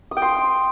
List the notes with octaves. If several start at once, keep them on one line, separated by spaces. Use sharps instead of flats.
D#6
G5
C6